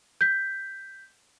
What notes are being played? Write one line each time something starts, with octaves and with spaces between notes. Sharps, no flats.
G6 B6